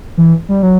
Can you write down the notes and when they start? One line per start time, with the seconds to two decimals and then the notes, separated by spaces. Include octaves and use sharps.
0.17 E3
0.49 G3
0.63 F#3